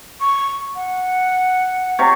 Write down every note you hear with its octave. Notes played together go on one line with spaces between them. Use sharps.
C#6
F#5
C3 C#5